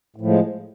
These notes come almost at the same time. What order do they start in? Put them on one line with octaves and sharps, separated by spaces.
A2 F3 G#3